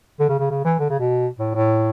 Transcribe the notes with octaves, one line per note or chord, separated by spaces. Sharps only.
D3
C#3
C#3
C#3
E3
D3
C#3
B2
A2
A2